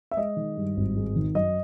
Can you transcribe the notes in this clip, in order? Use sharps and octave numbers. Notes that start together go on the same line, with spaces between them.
E5
G#3 D#5
D#3
G2
G#1
G#3
D#3
F#2 D#5